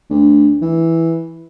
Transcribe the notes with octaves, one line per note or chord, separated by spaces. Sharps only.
D2
E3